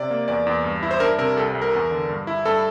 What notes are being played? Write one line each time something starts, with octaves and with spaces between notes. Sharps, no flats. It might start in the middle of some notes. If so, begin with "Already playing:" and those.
Already playing: C3 D5
A#3
E2 D5
E2
G2
E4
C5
D4 A#4
C3 A#4
C2 A4
C2
A#4
E2
D3
G2
E4
G2 A4